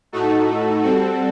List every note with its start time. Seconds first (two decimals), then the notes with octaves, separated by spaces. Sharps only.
0.12 A2 A3 D#4 F#4 A4
0.84 G3 C4 F#4 A4